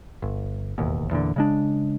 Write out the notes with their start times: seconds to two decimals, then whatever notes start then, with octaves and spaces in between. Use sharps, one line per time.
0.22 G1
0.78 E1 A1 D#2
1.11 E2 A#2 D3
1.36 C#3 G#3 D4